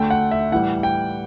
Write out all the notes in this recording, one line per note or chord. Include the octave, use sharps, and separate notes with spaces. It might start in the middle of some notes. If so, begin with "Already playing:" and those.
Already playing: D2 D3 A3 G5
F#5
E5
A2 E3 G3 F#5
G5